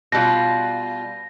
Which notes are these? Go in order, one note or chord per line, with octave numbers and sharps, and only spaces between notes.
B2 G3 F4 A#6